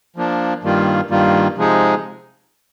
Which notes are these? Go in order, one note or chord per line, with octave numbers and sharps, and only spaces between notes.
F3 A#3 D4
G2 D#3 G3 A#3 F4
G2 D#3 G3 A#3 F4
C3 F3 G#3 D#4 G#4